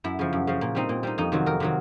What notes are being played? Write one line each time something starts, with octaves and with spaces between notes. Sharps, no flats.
F#2 E4
C#3 F3
F#2
C#3 F3
A#2
G3 C4 D#4
A#2
G3 C4 D#4
F2 D#4
C3 D#3 F#3
F2 A#4
C3 D#3 F#3